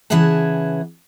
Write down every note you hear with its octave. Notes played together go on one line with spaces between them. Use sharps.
C#3 E3 G#4 E5 F#5 A5